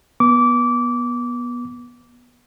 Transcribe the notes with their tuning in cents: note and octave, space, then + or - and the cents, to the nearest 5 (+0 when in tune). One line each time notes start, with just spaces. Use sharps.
B3 -20 D6 -20